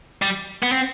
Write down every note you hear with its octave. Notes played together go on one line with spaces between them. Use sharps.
G3
B3
C4